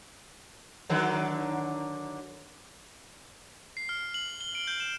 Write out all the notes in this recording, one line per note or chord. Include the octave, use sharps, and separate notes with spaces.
D3 D#3 F#3
C7
F6
F#7
G7
D7
G6
E7